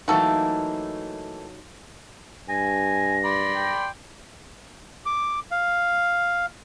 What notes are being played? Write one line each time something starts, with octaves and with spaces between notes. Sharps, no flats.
E3 F#3 A3 A#3 D#4 F#4 A4
G2 G#5 A#6
D5 B5 C6
G5
D6
F5